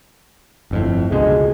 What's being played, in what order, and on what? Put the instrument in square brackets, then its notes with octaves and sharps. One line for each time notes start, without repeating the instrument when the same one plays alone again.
[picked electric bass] G1 F2 A2
[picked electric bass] C#2 B2 D3 [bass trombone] G#3